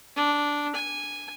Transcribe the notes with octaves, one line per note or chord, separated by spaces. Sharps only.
D4
G#5